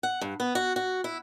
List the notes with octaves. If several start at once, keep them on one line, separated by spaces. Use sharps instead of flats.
F#5
G2
B3
F#4
F#4
E4